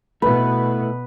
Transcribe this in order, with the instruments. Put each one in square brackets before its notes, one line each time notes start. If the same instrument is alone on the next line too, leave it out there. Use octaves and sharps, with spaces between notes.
[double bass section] B2 B3 [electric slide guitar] A3 E4 [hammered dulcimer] B4